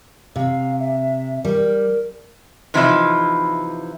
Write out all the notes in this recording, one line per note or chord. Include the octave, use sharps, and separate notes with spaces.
C3 F5
E5
G3 A#4
C3 E3 F3 D#4 E4 E5